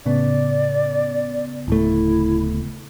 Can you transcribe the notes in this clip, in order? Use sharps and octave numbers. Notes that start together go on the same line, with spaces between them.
A2 C#3 B3 D5
D1 A3 E4